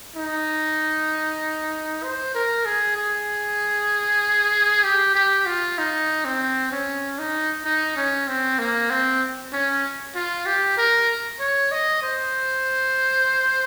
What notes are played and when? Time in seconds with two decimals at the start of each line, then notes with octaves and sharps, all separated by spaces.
0.16 D#4
2.03 C5
2.34 A#4
2.65 G#4
2.97 G#4
4.84 G4
5.15 G4
5.46 F4
5.78 D#4
6.25 C4
6.72 C#4
7.19 D#4
7.65 D#4
7.96 C#4
8.28 C4
8.59 A#3
8.90 C4
9.52 C#4
10.15 F4
10.46 G4
10.77 A#4
11.39 C#5
11.71 D#5
12.02 C5